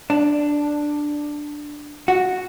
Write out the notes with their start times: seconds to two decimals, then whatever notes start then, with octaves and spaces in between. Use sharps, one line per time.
0.10 D4
2.08 F#4